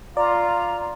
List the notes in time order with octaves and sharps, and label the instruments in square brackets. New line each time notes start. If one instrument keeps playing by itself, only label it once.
[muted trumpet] F4 [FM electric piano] D5 [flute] A#5